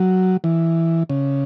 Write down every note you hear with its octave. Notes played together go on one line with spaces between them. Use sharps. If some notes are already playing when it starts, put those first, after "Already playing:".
Already playing: F#3
E3
C#3